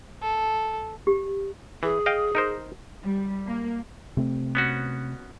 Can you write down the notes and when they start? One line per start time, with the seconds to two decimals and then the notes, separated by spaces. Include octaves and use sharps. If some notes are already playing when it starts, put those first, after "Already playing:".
0.22 A4
1.07 G4
1.83 E3 G#4
2.06 D#5 F5 G5
2.35 D#4 A#4 C5
3.04 G3
3.47 A#3
4.17 C3 A3 C4
4.55 B3 C#4 F#4